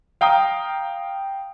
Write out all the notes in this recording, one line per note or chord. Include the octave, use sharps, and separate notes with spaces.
F5 G5 A#5 D#6